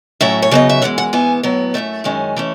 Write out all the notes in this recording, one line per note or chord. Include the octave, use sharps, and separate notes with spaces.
A2 F#3 C#4 E5
C#5
C#3 F#3 B3 D#5
E5
F#2 E3 G#3 F#5
F#5
G#2 E3 B3 G#5
A2 F#3 B3
F#2 E3 A3 E5
F#2 D#3 G#3 C#4
E3 A3 C#4